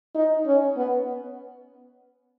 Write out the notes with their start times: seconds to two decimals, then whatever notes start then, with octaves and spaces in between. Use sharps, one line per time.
0.15 D#4
0.46 C#4
0.77 B3